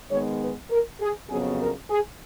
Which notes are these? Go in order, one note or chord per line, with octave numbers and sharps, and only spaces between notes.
G#2 D#3 G#3 B3 C#5
B4
A#4
G#4
F2 C#3 F#3 B3 G#4
A#4
G#4